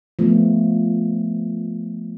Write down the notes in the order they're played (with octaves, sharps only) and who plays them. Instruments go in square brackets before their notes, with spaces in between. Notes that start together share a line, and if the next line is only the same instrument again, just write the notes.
[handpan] F3 A3 B3